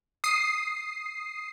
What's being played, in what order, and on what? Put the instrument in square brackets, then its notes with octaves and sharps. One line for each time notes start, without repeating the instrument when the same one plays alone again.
[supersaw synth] D#6 C7